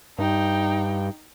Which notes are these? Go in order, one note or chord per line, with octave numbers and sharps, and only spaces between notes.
G2 D#4 G5